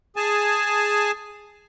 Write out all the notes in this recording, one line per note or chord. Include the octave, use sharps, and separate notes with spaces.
G#4 G#5 A5